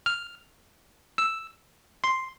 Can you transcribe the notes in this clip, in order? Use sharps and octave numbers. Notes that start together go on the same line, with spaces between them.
F6
E6
C6